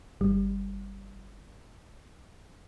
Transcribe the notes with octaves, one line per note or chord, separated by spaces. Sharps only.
G1 G3